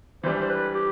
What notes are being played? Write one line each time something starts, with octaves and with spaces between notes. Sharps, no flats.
E3 G3 D4 C5
C5
B4
G4